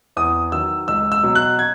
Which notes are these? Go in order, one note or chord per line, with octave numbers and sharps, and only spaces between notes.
E2 D#6
D#3 F#3 E6
C#2 E6
E6
B2 F#3
F#6
G#6